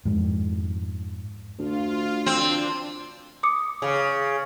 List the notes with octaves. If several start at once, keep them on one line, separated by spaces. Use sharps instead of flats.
F2 G#2
D2 F4
C4 D4
D6 D#6 C#7
C#3